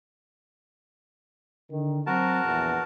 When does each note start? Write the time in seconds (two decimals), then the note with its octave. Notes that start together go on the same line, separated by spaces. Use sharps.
1.71 D3 D#3
2.07 F#3 C4 F#4 A#4 A5
2.45 A#1 E2